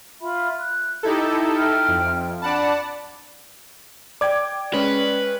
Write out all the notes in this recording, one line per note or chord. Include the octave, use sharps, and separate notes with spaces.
F4 E5 B5
F#6
D#4 E4 G4 A4
E5 G5 F6
F2
D4 D5 F#5 A5 B5
D5 G5 D6 G#6
G#3 C#4 B4